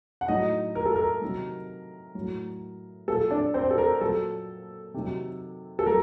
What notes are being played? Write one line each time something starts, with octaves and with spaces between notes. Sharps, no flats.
F#5
A2 F#3 D#4 D#5
A#4
A4
A#4
C3 D#3 F#3
A2 F#3
A#2 F#3 A4
D4 D5
C4 C5
A4
A#4
A#2 F#3 A4
C3 D#3 F#3
A4
F#3 A#4